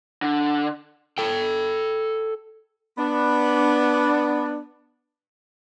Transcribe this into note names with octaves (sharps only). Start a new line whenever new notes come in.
D3
A4 G5
B3 D4